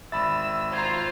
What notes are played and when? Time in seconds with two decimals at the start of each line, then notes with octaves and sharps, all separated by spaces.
0.12 G#1 E5 B5 E6 A6
0.74 F4 C5 A#5 G#6